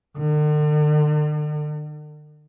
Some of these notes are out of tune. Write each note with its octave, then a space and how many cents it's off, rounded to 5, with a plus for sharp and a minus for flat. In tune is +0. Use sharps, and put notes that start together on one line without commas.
D3 +45